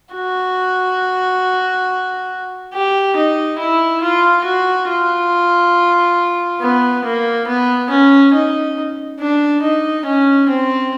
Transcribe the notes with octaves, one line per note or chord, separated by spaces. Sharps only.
F#4
G4
D#4
E4
F4
F#4
F4
B3
A#3
B3
C#4
D#4
D4
D#4
C#4
C4